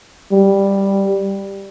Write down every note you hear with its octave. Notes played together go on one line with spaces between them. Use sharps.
G3